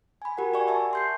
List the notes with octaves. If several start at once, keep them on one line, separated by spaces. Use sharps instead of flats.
G#5 B5
F#4 G4 A#4 F#5
G4 D5 G#5 C#6
E5 G#5 A5 C#6
C6 G6 C7